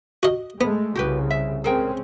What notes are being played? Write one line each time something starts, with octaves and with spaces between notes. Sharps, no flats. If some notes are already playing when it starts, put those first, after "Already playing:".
F#4 D#5
G#3 A3 B3
C2 C#3 F#4 G4 B4
E5
G#3 C4 C#4 G#4 A#4 G5